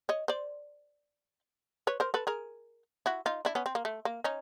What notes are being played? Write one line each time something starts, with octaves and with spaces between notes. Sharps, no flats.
C#5 D#5
C5 D5
B4 C#5
A#4 C5
A4 B4
G#4 A#4
E4 F#4
D#4 F4
D4 E4
B3 C#4
C4
A#3
A3
A#3
C#4 D#4